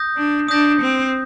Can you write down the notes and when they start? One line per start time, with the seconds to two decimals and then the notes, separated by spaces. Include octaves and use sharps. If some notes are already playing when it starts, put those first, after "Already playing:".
Already playing: D#6 G6 A#6
0.17 D4
0.48 D4 D#6 G6 A#6
0.81 C4